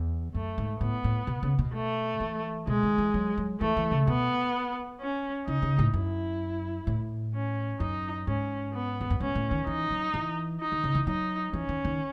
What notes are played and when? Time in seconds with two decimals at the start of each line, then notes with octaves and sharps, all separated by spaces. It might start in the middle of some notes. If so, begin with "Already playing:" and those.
Already playing: E2
0.34 F#2 A3
0.58 G#2
0.81 A2 B3
1.04 A2
1.27 B2
1.43 C#3
1.59 B2
1.74 A3
2.20 E3
2.67 B2 G#3
2.83 D#3
2.98 E3
3.14 F#3
3.38 F#3
3.61 E3 A3
3.77 E3
3.91 C#3
4.07 B2 B3
5.00 C#4
5.47 C#3 D#4
5.62 C#3
5.79 A2
5.93 F#2 E4
6.87 A2
7.34 C#4
7.80 F#2 D#4
8.27 G#2 C#4
8.73 B3
9.01 E2
9.10 F#2
9.20 G#2 C#4
9.35 A2
9.51 D#3
9.67 E3 D#4
9.91 F#3
10.14 E3
10.60 D#4
10.72 D#3
10.84 C#3
10.95 E3
11.07 F#3 D#4
11.53 E3 C#4
11.69 D#3
11.85 D#3